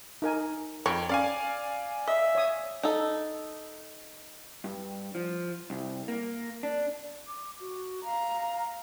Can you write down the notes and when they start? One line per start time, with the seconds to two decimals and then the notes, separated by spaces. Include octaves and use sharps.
0.22 D#4 A#4 G#5
0.86 F2 C#5 G5
1.09 C#4 D5 F5 G#5
2.07 D#5 E5
2.35 C#5 D#6
2.83 D#4 A4
4.64 G2
5.15 F3
5.70 C2
6.08 A#3
6.63 D4
7.27 D6
7.60 F#4
8.04 F5 A#5